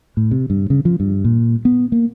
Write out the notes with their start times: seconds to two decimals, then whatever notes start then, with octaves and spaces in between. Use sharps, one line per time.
0.17 A2
0.31 C3
0.50 G2
0.70 C#3
0.85 F3
1.00 G2
1.25 A#2
1.65 B3
1.92 A#3